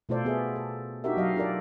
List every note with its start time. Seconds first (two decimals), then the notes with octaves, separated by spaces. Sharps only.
0.09 B2 A3 F4 A4 C5 D5
0.25 B3 G#4 A4 E5
0.56 A4
1.04 D4 D#4 F#4 G4 A#4 E5
1.17 F#3 D#5 F5
1.36 D4 F4 G4 A4 A#4 D5